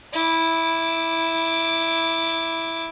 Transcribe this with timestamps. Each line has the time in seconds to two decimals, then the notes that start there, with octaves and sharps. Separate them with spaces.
0.13 E4 D6